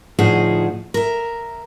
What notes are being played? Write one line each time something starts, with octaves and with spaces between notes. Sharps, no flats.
D2 A2 F3 D#4 G#4 F#5
A#4 E5